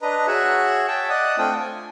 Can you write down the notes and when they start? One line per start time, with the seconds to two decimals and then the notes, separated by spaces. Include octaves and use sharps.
0.02 D4 B4 D#5 A#5
0.27 F#4 G#4 C#5 E5 F#5
0.88 C#5 E5 G5 A5
1.09 D5 D#5 F#5 D#6
1.38 A3 C4 D4 F4 G5 D#6
1.60 G#5